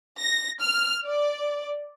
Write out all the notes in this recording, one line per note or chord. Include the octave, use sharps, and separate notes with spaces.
A#6
F6
D5